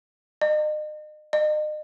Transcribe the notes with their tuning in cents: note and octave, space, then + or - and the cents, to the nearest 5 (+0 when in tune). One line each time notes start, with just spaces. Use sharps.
D#5 -40
D#5 -40